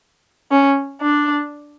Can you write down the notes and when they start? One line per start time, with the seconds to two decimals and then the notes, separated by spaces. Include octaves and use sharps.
0.51 C#4
1.01 D4